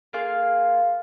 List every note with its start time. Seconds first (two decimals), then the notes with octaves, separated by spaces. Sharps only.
0.13 A#3 F4 G#4 F5